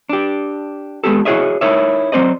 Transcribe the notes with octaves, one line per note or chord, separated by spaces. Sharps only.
D4 G4
G#3 B3 G4 A4
E4 F#4 G#4 C#5 D#5 E5
D#4 E4 A#4 C#5 E5
F#3 G#3 C4 C5 D5 D#5